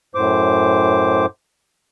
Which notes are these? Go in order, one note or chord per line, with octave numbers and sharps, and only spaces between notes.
F#2 A2 C5 D6